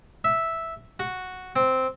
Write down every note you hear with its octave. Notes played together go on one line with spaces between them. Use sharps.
E5
F#4
C4